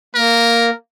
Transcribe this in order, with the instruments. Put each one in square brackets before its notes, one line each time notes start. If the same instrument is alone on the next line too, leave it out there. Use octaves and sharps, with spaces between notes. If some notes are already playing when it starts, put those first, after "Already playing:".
[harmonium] A#3 [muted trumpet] A#4